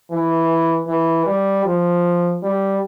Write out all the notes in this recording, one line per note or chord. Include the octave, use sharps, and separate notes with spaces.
E3
E3
G3
F3
G3